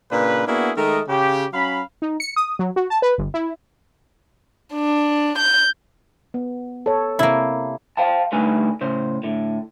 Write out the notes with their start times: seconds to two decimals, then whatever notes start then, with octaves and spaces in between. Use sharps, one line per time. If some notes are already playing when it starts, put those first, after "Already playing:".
0.11 A#2 C#3 D4 B4
0.47 A#3 B3 D4 E4 F#4 G#4
0.77 D#3 G#3 A3 A#4 D#5
1.09 C#3 G4
1.54 F#3 C#4 F5 B5
2.02 D#4
2.20 C#7
2.36 D#6
2.59 F#3
2.76 F#4
2.90 A5
3.02 B4
3.18 G1
3.34 E4
4.74 D4
5.38 G6
6.34 B3
6.86 A4 C#5
7.19 C3 A#3 E4
7.97 C5 F5 G5 A5
8.32 D3 G3 A3 D#4 B4 G#5
8.81 A2 C#3 C5
9.23 A2 D3